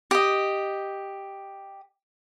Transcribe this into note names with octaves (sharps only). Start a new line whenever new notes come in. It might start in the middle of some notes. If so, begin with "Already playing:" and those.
G4 D#5